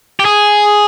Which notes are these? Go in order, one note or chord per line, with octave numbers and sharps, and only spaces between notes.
G4
G#4